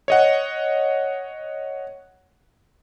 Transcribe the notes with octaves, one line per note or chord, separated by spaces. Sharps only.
C#5 D#5 F#5